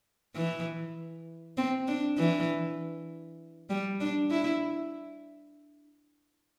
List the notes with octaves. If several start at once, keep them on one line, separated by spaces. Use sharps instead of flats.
E3
C4
D4
E3
G3
D4
E4